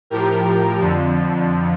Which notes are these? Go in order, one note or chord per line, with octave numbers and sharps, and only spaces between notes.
A2 F3 G4 A#4
F2 D3 F3